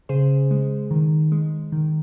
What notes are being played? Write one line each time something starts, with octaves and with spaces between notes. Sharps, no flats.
C#3 G#4 C5
G#3
D#3
G#3
D#3